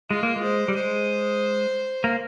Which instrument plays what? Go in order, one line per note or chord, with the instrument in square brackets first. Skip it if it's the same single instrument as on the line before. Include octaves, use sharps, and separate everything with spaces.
[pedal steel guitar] G#3 [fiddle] F4
[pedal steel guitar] A#3
G#3
[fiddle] C5
[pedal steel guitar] G3
[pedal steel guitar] G#3 [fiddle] C5
[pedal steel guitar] A#3